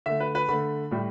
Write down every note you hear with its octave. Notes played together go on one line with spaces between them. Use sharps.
D3 A3 E5
B4
B4
D3 A3 B5
A2 G3